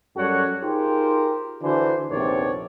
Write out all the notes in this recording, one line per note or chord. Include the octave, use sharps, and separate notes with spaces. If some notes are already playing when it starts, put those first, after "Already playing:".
F#2 G3 F#4 A4 C#5 F#5
D#4 F4 G4 G#4 A#4 C5
D3 E3 D4 F#4 C5
A#1 D#2 C3 B3 C#5 D5